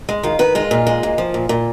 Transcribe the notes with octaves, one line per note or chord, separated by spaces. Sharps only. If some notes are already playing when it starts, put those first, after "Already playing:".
G#3
D#3 F4
D#3 B4
G#3 F4
A#2
G#3
A#2
F3
A#2
A#2